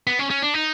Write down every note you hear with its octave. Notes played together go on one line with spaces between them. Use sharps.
B3
C#4
C#4
D4
D#4